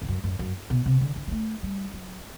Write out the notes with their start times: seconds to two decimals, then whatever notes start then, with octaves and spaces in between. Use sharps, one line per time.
0.02 E2
0.08 F#2
0.24 F#2
0.39 F#2
0.70 B2
0.86 C3
1.01 D3
1.16 D3
1.27 G3
1.32 A3
1.63 G3
1.94 F#3